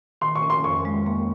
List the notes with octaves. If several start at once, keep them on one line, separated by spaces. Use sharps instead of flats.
D#3 C6
C#6
C#4
C6
F2 C#6
G#3
A#3